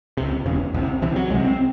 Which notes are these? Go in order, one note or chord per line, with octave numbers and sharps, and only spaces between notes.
C#2 C3
E1 E2 C#3
C2 C3
C2 C3 E3
F#3
C2 C3 G#3
C4